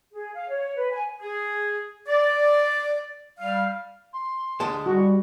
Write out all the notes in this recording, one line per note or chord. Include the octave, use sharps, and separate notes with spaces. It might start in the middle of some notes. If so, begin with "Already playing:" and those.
G#4
F5
C#5
B4
G#5
G#4
D5
G3 F5
C6
D2 G#3 A5
G3 E4 F#4